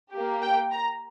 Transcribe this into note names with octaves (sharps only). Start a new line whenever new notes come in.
A#3 G4
G5
A#5